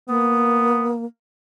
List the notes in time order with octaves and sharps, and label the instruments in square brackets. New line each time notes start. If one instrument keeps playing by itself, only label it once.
[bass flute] A#3 [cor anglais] B3